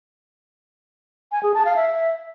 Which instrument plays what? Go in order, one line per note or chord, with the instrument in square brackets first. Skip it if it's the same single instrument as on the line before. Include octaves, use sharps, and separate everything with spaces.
[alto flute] G#5
G#4
A5
F5
E5